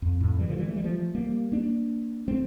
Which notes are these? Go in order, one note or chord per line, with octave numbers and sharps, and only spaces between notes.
F2
F2 A2
E3 G3
D3 F3
E3 G3
A3
G3
F3 A3
G3 A#3
A#3 D4
A3 C4